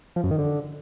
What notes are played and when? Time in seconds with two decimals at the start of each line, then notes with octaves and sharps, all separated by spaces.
0.16 F3
0.24 F#2
0.31 D#3
0.38 D3